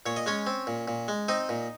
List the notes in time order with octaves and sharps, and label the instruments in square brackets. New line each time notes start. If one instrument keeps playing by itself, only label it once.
[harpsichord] A#2 C#5
D#5
G#3 C#4 C#5
C4
A#2
A#2
G#3
C4 D#4 D#5
A#2